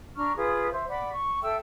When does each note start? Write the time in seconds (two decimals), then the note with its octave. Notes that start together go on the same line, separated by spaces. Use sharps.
0.16 D4 A#5 C#6 F6
0.37 F4 G#4 B4 D#6
0.72 C5 E5
0.89 D5 F#5 B5 D6
1.12 C#6
1.43 A4 E5 G5 E6